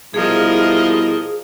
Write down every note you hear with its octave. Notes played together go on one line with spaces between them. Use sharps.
B2 F3 G3 E4 G#4 A#4 D#5